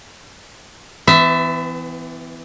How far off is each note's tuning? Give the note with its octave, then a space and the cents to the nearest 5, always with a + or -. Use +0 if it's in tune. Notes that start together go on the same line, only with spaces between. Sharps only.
E3 +0 B3 +40 E5 +0